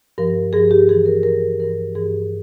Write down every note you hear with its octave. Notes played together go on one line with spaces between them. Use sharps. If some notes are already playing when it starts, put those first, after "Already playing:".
G2 F3 A#4
G2 F3 G#4
G4
G2 E3 G#4
A#4
G2 E3 A#4
G2 E3 A#4
G2 E3 G#4